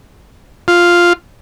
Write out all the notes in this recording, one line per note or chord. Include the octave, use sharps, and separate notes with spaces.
F4